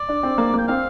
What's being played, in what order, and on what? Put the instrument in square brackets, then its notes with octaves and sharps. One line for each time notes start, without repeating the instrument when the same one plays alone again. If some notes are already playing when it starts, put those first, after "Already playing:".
Already playing: [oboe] D5
[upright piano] D4
C4
A#3
[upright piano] A#3 [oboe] G5
[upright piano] C4 [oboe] F5